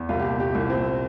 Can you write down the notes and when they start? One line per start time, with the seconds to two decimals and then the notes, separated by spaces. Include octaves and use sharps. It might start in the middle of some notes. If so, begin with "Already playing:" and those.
Already playing: E2
0.09 C2 F4
0.19 G4
0.25 A#2
0.40 C2 G4
0.55 C2 E4
0.70 A#2 C4